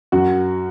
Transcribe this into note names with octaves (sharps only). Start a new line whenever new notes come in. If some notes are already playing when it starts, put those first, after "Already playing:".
F#2 F#4